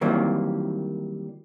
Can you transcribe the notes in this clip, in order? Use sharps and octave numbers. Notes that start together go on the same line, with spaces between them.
D#3 E3 F#3 G3 A#3 C4